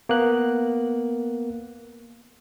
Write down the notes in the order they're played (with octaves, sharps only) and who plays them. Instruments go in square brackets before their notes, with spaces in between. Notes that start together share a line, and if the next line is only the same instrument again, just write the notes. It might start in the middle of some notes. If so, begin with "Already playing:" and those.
[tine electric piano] A#3 B3 F#6